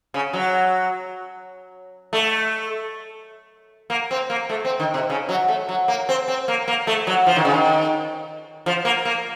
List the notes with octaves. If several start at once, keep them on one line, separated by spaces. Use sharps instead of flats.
C#3
F#3
A3
A#3
C4
A#3
A3
C4
D#3
C3
C#3
F#3
A3
F#3
A#3
C4
C4
A#3
A#3
A3
F#3
F3
D#3
C#3
D#3
F3
A#3
A#3